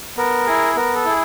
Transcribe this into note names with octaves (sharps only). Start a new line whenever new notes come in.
B3 A#4
E4 G#4
B3 A#4
A4
E4 G#4